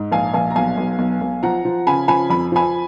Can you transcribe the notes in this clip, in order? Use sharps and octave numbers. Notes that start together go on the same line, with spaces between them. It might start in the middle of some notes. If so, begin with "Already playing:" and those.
Already playing: G#2
A#1 F5 G#5
A#1 F5 G#5
A#5
B1 F5 G#5
B1
B1
B1
F3 F#5 A#5
F3
C#3 G#5 B5
F3 G#5 B5
F2 B5
F3 G#5 B5